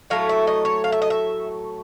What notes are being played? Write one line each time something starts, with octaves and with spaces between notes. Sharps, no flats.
A2 F#3 A3 F5
E5
D#5
C#5
F5
E5
D#5
E5